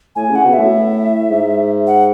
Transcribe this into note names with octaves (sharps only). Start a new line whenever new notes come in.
A2 G#5
C#3
F#5
B2
E5
A2
G#2
F#5